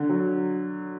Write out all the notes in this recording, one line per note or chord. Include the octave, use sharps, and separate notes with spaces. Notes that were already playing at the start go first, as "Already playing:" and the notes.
Already playing: D3
F#3